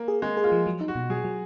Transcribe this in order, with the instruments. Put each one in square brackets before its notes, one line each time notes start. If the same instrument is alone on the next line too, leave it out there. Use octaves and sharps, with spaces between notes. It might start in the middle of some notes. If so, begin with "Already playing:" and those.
Already playing: [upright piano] A#3
[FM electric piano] G#4
[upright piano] G#3 [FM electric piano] G#4
[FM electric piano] G#4
[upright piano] F4
[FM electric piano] F3
F#3
D#4
[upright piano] F#4
[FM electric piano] B2
[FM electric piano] F#3 [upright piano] G#4
[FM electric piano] F#3